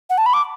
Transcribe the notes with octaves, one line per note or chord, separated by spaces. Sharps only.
F#5
A5
B5
D6